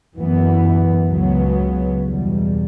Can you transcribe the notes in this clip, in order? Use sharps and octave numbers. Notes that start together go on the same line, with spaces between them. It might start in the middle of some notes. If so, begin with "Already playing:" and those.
F#2 E3 B3
C#2 C#3 F#3 B3
E2 B2 G3